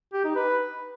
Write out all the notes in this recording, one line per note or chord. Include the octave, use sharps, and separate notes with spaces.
G4
D#4
B4